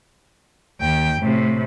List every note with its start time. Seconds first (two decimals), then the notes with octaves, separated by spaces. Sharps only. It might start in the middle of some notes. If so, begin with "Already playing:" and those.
0.81 D#2 G5
1.21 A2 C3